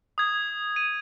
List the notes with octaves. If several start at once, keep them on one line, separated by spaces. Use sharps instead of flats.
D#6 G#6
D#7